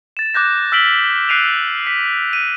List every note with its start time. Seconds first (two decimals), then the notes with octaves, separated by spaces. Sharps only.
0.17 A6 E7
0.34 D6 F#6 G6 A#6
0.72 E6 F6 B6 D7 F#7 G7
1.29 F#6 C7 D7 D#7 F7
1.87 B6 C7
2.33 D#7